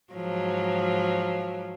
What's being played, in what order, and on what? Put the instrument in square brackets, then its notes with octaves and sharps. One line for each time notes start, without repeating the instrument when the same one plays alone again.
[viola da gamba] G#2 F3 F#3